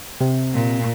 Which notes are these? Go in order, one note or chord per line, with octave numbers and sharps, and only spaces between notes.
C3
A#2